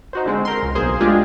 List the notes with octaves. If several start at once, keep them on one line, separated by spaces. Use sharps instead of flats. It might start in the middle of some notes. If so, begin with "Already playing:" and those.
D#4 F#4 C5
D3 G#3 C4
A#4 C6
C#2
B1 A#3 G#4 C5
G#3 A3 D4 F4 G4 G#4